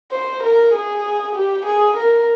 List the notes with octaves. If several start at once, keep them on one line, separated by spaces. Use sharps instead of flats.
C5
A#4
G#4
G4
G#4
A#4